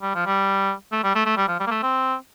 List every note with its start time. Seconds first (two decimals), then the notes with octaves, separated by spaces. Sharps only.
0.02 G3
0.15 F3
0.26 G3
0.92 A3
1.04 G3
1.15 A3
1.26 A3
1.37 G3
1.48 F3
1.60 G3
1.67 A#3
1.71 A3
1.83 C4